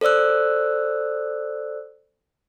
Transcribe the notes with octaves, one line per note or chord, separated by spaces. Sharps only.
A4 C5 D5 E6 F#6